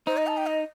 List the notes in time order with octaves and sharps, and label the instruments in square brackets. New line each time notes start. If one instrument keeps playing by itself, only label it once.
[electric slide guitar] D#4 [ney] C5
[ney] D#5
A5
G5
D#5